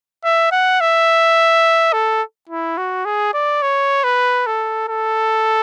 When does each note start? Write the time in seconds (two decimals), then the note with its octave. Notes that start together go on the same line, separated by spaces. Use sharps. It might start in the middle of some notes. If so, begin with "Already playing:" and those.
0.24 E5
0.52 F#5
0.81 E5
1.93 A4
2.49 E4
2.78 F#4
3.05 G#4
3.34 D5
3.62 C#5
4.04 B4
4.46 A4
4.88 A4